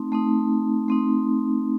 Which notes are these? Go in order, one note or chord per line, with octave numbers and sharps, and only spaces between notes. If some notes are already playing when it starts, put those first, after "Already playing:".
Already playing: A3 C4 D#4
A3 C4 D#4
A3 C4 D#4